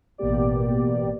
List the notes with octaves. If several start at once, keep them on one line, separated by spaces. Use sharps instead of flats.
A1 B2 A#3 B3 G4 D5